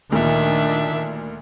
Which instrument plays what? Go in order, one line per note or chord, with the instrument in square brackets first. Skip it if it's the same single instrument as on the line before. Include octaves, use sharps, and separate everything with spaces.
[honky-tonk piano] D2 A#2 [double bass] D#3 [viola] D4 E5